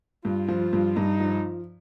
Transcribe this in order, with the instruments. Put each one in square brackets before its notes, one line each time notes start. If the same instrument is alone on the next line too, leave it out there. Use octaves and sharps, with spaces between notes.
[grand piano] G2 [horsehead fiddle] F4
[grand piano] F3
G2
[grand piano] G2 [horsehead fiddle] D#4
[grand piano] F3